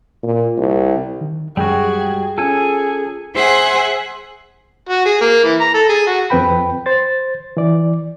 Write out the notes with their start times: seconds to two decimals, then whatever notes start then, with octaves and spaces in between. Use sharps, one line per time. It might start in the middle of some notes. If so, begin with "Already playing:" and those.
0.23 A#2
0.58 C2
1.21 D#3
1.57 F#2 G3 G#3 F#4 G#4 G5
2.38 C#4 F4 G#4 A4 G#5
3.33 G#4 C5 E5 F#5 G#5
4.89 F#4
5.06 G#4
5.21 A#3
5.44 E3
5.60 A#5
5.74 A4
5.89 G#4
6.07 F#4
6.30 F2 C4 B4 G5 B5
6.86 C5 A6
7.57 E3 D5